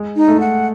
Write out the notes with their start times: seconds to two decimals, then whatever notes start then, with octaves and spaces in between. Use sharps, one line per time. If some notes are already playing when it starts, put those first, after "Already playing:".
Already playing: G#3
0.16 D#4
0.28 A3
0.40 F#5